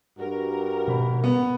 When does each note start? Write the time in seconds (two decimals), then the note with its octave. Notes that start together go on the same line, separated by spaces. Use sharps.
0.19 G2 G3 F#4 A#4
0.88 G#1 B2 B5
1.24 B3